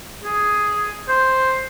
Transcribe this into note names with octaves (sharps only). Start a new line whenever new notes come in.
G#4
C5